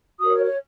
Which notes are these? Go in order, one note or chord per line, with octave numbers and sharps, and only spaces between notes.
F#4 A#4 C#5 D#6
C#5
C#5